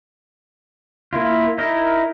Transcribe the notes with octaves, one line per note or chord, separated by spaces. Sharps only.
A#3 E4 F4
D#4 E4 A#4 D#5